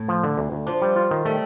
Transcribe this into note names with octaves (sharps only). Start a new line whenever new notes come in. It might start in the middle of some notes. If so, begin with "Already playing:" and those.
Already playing: A2
F3
D3
D2
D2
F3 D4
G3
F4
D#3
G3 A3